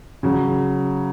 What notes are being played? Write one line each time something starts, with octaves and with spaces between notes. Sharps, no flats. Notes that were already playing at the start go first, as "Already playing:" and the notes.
C#3 F#3